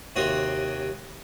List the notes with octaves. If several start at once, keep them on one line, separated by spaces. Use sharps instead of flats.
D#2 C3 F#4 C#5 C6 D#6